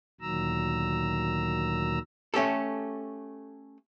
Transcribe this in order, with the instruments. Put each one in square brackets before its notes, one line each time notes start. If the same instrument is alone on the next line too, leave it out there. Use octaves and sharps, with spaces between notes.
[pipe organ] D2 A#2 D#3 F#3 A#5 E6
[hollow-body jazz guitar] A3 C#4 G4 A4